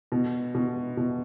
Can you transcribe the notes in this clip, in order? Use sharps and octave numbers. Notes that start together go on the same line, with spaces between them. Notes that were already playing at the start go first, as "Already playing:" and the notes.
B2
B2
B2